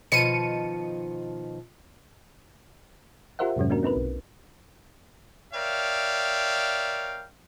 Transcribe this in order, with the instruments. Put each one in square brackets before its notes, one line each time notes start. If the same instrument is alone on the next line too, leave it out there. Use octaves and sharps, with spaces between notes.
[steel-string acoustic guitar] B2 D#3 F3 [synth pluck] C#7 D#7
[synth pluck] F4 G4 A#4 C5 E5 F#5
F2 G#2 C3 F#3 G#3 C#4
A#3 C#4 D4 F#4 A#4
C4 D#4 A#4 B4
B1
[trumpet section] A#4 C#5 D5 E5 F5 G5